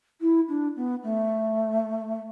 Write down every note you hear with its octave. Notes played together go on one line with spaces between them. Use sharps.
E4
D4
B3
A3